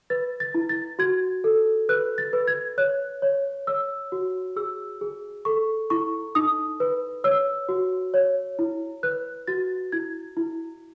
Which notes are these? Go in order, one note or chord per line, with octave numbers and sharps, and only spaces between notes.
B4 A6
A6
E4
A6
F#4 G#6
A4
B4 F#6
A6
B4
G#6
C#5 F#6
C#5
C#5 E6
F#4
G#4 E6
G#4
A4 C#6
E4 C#6
D#4 D#6
B4
C#5 E6
F#4
C#5
E4
B4 F#6
F#4 A6
E4 G#6
E4